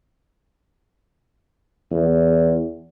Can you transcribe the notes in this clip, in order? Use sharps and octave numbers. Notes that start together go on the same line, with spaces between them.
E2